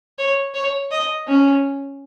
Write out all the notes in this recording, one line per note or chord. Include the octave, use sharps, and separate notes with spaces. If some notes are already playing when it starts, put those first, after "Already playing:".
C#5
C#5
D#5
C#4